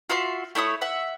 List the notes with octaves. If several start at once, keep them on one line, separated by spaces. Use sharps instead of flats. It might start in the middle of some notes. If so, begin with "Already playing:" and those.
F4 F#4 E5 C6
A3 E4 C#5 D#6
E5 F#5